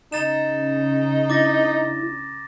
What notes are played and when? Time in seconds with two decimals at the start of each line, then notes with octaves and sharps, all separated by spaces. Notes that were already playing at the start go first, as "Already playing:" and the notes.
0.12 C#3 D#4 A#5 A6 E7
1.30 D4 E4 D6 A6 A#6